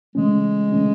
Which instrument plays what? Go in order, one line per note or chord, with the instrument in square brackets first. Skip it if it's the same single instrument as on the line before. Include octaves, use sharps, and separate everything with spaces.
[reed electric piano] C#3 E3 A3 C#4 [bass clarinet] G#3
[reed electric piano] C#3 E3 A3 C#4